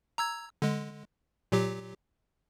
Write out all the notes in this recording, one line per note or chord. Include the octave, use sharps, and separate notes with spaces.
A#5 E6 G#6
D3 G#3
A#2 F#3 G4